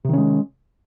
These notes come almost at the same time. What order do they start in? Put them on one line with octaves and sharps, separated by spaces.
C3 D#3 C#4 G#3